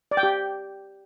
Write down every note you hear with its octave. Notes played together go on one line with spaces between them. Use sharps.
D5
G5
G4